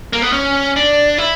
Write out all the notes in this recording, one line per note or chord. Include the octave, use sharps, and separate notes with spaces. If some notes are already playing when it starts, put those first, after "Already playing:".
A#3
B3
C#4
D4
E4